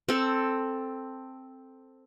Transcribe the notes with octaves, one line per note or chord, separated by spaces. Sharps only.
C4 A4